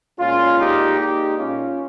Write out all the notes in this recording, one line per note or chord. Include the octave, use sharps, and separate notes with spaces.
A#2 G#3 C#4 F4
D#4 G4
D#4 G4
C#4 F4